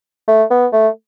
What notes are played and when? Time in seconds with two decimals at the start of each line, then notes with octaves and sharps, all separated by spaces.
0.27 A3
0.50 B3
0.72 A3